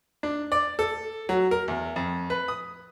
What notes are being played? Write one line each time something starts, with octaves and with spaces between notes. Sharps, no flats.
D4
D5
A4
F#3
A#4
E2
F2
B4
D#6